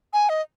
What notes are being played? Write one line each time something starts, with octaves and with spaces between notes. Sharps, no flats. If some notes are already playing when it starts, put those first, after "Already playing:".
G#5
D#5